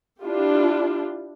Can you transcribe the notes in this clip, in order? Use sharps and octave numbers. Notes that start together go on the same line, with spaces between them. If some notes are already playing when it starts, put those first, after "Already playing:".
D4 E4 F4 G4